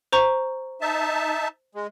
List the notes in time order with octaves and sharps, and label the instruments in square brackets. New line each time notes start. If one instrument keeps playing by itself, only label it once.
[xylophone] C5 A#5 C#6
[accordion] D#4 E5 A5
G#3